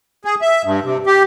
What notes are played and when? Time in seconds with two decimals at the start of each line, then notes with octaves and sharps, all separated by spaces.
0.25 G#4
0.42 E5
0.65 G2
0.84 C3
1.06 G4